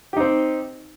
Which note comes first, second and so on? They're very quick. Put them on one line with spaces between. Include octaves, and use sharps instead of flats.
G4 D#4 C4